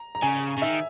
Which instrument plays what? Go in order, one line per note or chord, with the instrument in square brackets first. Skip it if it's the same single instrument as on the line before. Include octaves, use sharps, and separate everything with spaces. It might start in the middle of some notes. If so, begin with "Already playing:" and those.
Already playing: [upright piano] A#5
A#5
[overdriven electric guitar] C#3 [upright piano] G#5
[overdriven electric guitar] C#3
[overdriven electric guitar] D#3 [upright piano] E5